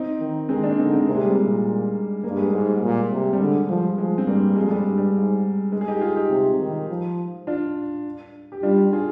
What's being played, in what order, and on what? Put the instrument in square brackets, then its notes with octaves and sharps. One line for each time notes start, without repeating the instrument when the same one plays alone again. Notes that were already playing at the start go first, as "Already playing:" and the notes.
Already playing: [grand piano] C4 D#4
[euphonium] D#3
[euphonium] D#3 [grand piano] G#3 C4
[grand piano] A#3 D4
[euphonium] D3 [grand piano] C4 D#4
[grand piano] G#3 C4
[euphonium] C3 [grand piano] A#3
[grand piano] G#3
G3
G#3
[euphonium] A#2
[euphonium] G2 [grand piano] A#3
[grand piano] G#3
[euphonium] G#2 [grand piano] G3 A#3
[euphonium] A#2
C3
[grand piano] G3
[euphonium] D3 [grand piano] G#3
[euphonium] F3 [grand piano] G3
[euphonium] F3 [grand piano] G#3
[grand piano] C4
[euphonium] G2 [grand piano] G3 A#3
[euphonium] F2 [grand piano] G#3
[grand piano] G3
[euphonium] G2
[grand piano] G3
[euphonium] G#2
[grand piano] G#3
G#4
D#4 G4
F4 G#4
D#4 G4
[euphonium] C3
D#3
F3
[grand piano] D4 F4
G4
[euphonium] G3 [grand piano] D4 F4
[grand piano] F4 G#4